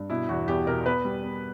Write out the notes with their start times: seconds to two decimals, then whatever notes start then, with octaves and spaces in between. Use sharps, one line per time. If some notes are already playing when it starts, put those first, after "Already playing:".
Already playing: G2
0.10 B2 E4
0.29 E2 F#4
0.48 E2 G4
0.67 B2 A#4
0.86 B3 B4
1.05 G3
1.23 B3